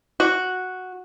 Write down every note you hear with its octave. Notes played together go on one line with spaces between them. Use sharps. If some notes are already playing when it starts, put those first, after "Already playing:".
F#4